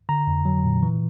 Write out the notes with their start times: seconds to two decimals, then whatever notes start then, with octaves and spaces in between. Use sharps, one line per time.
0.09 D3 A#5
0.27 F2
0.45 F#3
0.64 A#2
0.82 E3